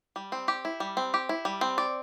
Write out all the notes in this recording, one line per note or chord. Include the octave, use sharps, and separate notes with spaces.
G3
C4
G4
E4
G3
C4
G4
E4
G3
C4
D5